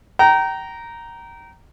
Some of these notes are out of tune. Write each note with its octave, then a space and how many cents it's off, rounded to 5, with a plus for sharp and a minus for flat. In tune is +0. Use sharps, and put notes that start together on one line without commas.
G5 -30 A#5 +0